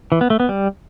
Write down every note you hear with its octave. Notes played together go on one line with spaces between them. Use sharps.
E3
B3
A3
B3
G3